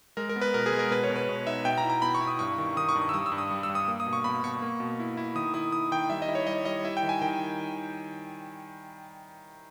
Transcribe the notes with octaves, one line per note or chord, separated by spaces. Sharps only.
G#3 A#4
A#4
B3
B4
B2 A#4
G#4
G#3
A#4
B2 B4
C#5
B2
B4
B2
D#4 E5
B2 G5
A#5
E4
A#5
B2 B5
C#6
E4
D#6
G2 C#6
D#3
D#3 D#6
C#6
G2
D#6
E6
G3 D#6
E6
G2
D#6
G3
E6
G2
D#6
A#3
D#6
B2
C#6
B2 B5
B2 C#6
A#3
B2
E4
E4
D#3 D#6
E4 D#6
E4 D#6
D#3 G5
G3 E5
D#5
E4
C#5
G3 D#5
G3 D#5
E4 E5
G5
D#3
G#5
D#3 G5